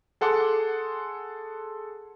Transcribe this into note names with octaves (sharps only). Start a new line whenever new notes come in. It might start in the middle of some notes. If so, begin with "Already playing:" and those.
G#4 A4 F#5 C6 D6